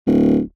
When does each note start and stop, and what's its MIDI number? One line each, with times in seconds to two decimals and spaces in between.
0.07 0.40 26